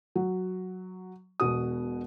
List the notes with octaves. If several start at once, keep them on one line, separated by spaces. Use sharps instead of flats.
F#3
E1 B2 F#4 D#6